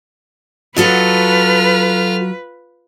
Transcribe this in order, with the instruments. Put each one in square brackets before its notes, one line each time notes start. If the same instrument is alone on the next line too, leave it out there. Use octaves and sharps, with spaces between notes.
[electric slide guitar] F#3 [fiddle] F4 F6 [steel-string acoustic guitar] F#4 A4 D#5 [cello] B4